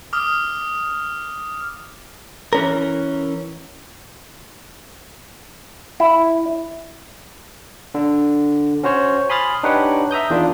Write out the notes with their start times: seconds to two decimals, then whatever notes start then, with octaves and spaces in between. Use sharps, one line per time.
0.13 D6 D#6 F6
2.53 E3 C#4 A#4
6.00 E4
7.94 D3
8.83 C#4 F#4 C5 C#5
9.29 G#5 B5 C6 D#6 F6 A6
9.63 D4 D#4 G4 B4 C#5 F#5
10.11 E5 A#5 D#6 G6
10.30 E2 D#3 D4 F4